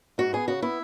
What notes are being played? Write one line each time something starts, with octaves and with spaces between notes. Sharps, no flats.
G#2 F#4
B3 G#4
C#3 F#4
B3 E4